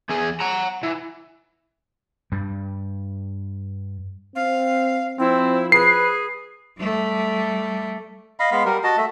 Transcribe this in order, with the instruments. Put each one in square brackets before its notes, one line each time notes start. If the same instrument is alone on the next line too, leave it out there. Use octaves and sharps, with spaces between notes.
[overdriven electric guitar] E2 G#4
F#5 A#5
E3
[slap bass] G2 G3
[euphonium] C4 [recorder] F5
[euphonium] F3 [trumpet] C4 [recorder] E4
[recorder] G#4 [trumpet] B4 [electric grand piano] C7
[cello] G3 A3
[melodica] D#5 F5 B5
G#3 B3 F5 B5
G3 A#4
F#4 D#5 A5
A3 E5